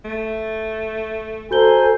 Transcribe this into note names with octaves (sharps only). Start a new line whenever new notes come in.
A3
F#4 A4 C5 G#5 A#5 G6 G7